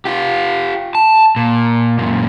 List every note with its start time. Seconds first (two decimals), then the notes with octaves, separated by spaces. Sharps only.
0.05 F4 G4
0.95 A5
1.36 A#2
1.99 F#2 A#2